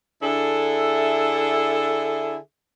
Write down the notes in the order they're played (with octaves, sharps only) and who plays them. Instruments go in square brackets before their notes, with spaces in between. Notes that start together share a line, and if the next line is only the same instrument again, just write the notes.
[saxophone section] D3 D4 E4 G#4 A4 E5